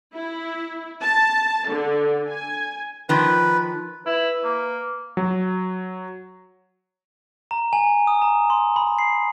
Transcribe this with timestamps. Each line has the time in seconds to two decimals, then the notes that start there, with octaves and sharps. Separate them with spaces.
0.14 E4
1.02 A5
1.69 D3
2.30 G#5
3.09 D#3 F3 B4
4.06 E4 B4
4.44 A#3
5.17 F#3
7.51 A#5
7.73 G#5
8.07 D#6
8.22 A#5
8.50 C6
8.76 B5
8.99 C7